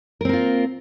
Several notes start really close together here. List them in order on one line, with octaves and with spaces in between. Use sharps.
A#4 C4 A#3 F4